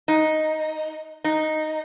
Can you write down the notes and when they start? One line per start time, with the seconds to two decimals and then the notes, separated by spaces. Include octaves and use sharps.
0.08 D#4
1.24 D#4